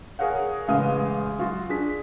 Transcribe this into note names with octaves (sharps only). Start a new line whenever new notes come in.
G#4 A#4 C#5 F5 F#5
A1 C#3 G#3 B4 F5 D#6
F#3 F4 F#4
D4 G#4 B6